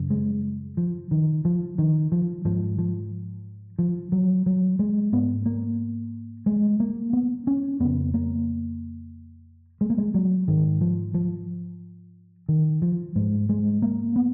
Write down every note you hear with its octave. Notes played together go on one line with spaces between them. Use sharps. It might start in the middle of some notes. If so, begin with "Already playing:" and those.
Already playing: F#2 C#3
G#3
F3
D#3
F3
D#3
F3
G#2 F3
F3
F3
F#3
F#3
G#3
G#2 B3
A#3
G#3
A#3
B3
C#4
F2 C#3 B3
A#3
G#3
A#3
G#3
F#3
G#2 D#3
F3
F3
D#3
F3
G#2 G#3
G#3
A#3
B3